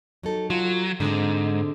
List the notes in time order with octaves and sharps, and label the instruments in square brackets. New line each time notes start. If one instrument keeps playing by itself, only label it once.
[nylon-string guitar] F#3 D#4 A4
[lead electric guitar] F#3 [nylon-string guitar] F4
[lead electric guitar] G#2 [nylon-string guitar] D3 G#3 C4